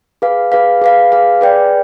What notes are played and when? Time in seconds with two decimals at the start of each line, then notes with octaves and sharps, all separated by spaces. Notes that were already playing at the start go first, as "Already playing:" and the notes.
0.22 G#4 B4 F5
0.52 G#4 B4 F5
0.82 G#4 B4 F5
1.12 G#4 B4 F5
1.41 G#4 B4 D5 G5